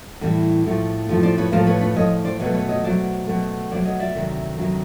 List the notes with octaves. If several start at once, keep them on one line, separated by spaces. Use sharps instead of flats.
A2 E3 G3
A2 F3 A3
A2 F3 A3
C5 D5
B4 C#5
A2 F3 A3 A#4 C5
B4 C#5
B4 C#5
A2 F3 A3 C#5 D#5
C5 D5
B2 F#3 A3 B4 C#5
B4 C#5
C#5 D#5
B2 F#3 A3 C5 D5
B2 F#3 A3
B2 F#3 A3 C5 D5
C#5 D#5
D5 E5
D2 C3 D#3 F#3
D2 C3 D#3 F#3